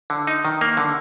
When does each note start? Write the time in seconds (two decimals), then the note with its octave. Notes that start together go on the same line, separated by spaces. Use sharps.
0.10 D3
0.27 D#4
0.45 D#3
0.61 A#3
0.77 D3